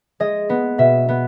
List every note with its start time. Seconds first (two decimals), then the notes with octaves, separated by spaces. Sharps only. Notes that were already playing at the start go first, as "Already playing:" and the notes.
0.20 G#3 D#5
0.49 B3
0.78 B2 E5
1.08 B3